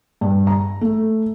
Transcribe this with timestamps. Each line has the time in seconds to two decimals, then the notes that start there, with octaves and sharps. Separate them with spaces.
0.21 G2
0.47 A#5
0.81 A3